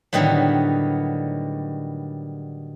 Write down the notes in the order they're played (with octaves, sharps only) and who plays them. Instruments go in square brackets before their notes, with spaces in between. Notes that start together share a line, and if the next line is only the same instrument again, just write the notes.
[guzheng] A2 D3 D#3 F#3 G3 B3